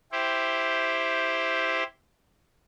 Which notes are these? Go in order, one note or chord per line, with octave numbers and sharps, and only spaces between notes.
E4 G4 C5